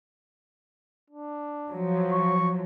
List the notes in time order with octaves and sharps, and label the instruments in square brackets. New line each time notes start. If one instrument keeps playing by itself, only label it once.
[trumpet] D4
[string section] F3 F#3
[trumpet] C#6